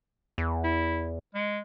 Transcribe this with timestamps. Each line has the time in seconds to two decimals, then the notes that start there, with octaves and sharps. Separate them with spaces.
0.38 E2
0.64 E4
1.35 G#3